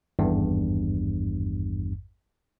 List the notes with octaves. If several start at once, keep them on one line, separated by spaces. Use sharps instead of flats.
G#1 E2 G2